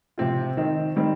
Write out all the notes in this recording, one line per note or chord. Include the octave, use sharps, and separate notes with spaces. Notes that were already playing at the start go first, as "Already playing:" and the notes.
C3 F3 C4 F4
D#3 C4 D#4
D#3 G3 C4 D#4